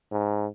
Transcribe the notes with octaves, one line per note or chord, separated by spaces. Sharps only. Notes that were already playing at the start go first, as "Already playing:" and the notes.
G#2